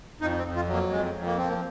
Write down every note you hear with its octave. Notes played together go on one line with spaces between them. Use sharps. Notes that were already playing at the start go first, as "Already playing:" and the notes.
F2 D#4
C4
F2
F4
F#3
A#3
F2 G#3
F2
A#3
F3 C4
A#3